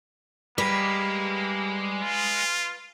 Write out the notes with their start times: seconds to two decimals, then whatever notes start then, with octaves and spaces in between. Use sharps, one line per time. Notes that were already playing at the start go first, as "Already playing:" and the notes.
0.58 G3 G#3 A#3 G4 B4
2.01 F4